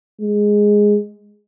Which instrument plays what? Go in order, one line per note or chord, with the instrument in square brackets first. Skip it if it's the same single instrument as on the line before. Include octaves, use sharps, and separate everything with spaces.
[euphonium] G#3